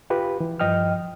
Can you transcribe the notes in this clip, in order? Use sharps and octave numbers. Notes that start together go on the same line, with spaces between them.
F4 G4 B4
E3
G2 F3 D#5 G5 F6